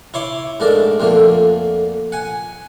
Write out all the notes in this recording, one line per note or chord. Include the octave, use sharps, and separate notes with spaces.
E4 C#5 C6 D6
G#2 A3 D4 A#4 A5
F2 D3 A3 A#3
F#5 G#5